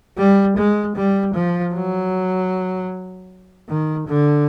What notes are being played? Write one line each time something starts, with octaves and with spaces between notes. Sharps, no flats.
G3
G#3
G3
F3
F#3
D#3
D3